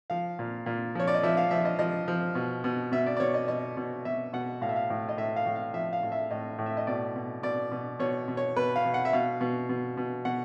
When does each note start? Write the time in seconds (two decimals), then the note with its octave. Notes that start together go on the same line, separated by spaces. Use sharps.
0.10 F3 F5
0.39 A#2
0.66 A#2
0.95 F3 C#5
1.07 D5
1.15 D#5
1.23 F3 E5
1.37 F5
1.51 F3 E5
1.65 D#5
1.79 F3 D#5
2.08 F3
2.35 B2
2.64 B2
2.92 B2 E5
3.06 D5
3.17 D5
3.20 B2 C#5
3.34 D#5
3.48 B2 D#5
3.77 B2
4.05 B2 E5
4.33 B2 F#5
4.61 A2 F5
4.69 E5
4.76 F5
4.90 A2
5.09 D#5
5.17 A2 E5
5.36 F5
5.46 A2
5.56 F5
5.74 F3 E5
5.93 F5
6.03 A2
6.12 E5
6.31 A2 D#5
6.59 A2
6.66 E5
6.77 D#5
6.87 B2 D5
7.16 B2
7.43 B2 D5
7.71 B2
7.99 B2 C#5
8.28 B2
8.37 C#5
8.56 B2 B4
8.76 F5
8.85 B2
8.94 F#5
9.05 E5
9.13 B2 F5
9.41 B2
9.69 B2
9.97 B2
10.25 B2 F#5